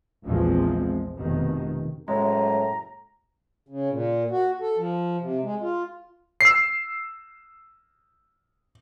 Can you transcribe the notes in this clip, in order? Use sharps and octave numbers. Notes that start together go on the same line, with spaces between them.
A#1 E2 A#2 F3 G#3 C4
F1 B2 D#3
F#1 A2 G#3 A#5
C#3
A#2
F#4
A4
F3
C3
G#3
F4
E6 C7